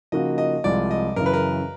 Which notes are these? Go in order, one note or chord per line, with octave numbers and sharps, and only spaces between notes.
C#3 F3 A#3 D#4 F#4 D#5
D#5
C2 C3 F3 G#3 D5
D#5
F#2 C#3 E3 A#4
B4
A#4